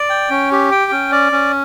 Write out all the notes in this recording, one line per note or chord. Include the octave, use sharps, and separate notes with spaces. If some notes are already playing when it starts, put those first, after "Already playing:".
Already playing: D5
G5
C#4
G4
G5
C#4
D5
C#4